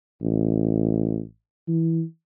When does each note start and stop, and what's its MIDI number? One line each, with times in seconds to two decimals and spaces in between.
0.22 1.21 33
1.68 2.03 52